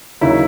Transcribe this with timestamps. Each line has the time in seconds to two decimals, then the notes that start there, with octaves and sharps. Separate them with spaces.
0.21 D#2 C#3 F#3 E4